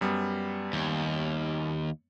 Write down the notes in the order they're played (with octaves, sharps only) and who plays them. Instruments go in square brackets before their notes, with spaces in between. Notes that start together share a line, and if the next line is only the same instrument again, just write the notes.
[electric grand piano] F#2 G3 B3
[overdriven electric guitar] D#2